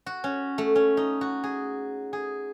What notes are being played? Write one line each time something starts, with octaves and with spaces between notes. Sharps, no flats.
F#4
C#4
A3
C#4
D#4
F#4
G#4
G#4